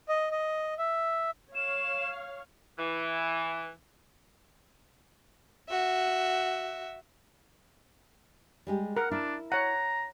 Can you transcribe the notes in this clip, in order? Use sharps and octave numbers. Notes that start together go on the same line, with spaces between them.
D#5
D#5
E5
C#5 F5 E7
E3
F#4 E5
G3 G#3 G4
A#4 F#5
D4 E4
C#5 F#5 A#5